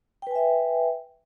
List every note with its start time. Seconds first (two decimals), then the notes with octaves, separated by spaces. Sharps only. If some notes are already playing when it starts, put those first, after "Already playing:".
0.22 G5
0.27 B4
0.31 G#5
0.35 E5